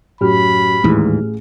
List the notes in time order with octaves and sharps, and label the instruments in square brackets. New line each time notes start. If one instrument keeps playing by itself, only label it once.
[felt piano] F#2 [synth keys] A2 G4 F6 [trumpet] B5
[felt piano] A1 G#4 [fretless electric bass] D#2 G#2 E3